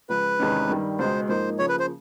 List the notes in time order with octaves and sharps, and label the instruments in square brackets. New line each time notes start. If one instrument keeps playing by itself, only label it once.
[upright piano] C#2 C#3 F3 [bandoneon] B4
[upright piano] E2 C3 D#3 G#3 C#4
G2 D#3 G3
[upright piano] C#2 B2 G#3 [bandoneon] C5
[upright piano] G#2 F3 A#3 D#4 [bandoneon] C5
[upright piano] C#3 F3 A#3 [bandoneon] C#5
[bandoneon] B4
C5